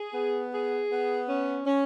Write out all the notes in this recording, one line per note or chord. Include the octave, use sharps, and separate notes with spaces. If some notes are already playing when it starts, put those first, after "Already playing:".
Already playing: G#4
B3
G#4
B3
C#4
C#4